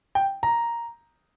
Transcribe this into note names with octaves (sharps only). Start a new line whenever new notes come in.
G5
A#5